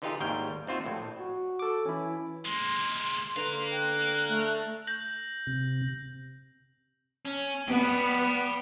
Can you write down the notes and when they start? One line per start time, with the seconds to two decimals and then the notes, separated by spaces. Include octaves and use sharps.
0.02 D3 E3 D#4 F4 G4 G#4
0.20 G#1 D#2 G3 A#4 G5
0.67 D#2 C4 F4 F#4 E5
0.86 A#1 A2
1.18 F#4
1.59 A4 D6
1.86 E3 C#4 E4
2.45 G#3 A#3 C6
3.36 D3 B4 F5 A#5
3.71 G5 F#6
4.28 A3
4.87 G6 A#6 F#7
5.47 C3
7.25 C#4
7.68 B3 G5 B5